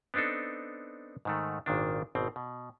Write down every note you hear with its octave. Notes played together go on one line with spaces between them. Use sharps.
B3 C4 D4 D#4 A4
G#2 D#3 A3
G#1 A#2 D#3 D4
G#1 B2 C4
B2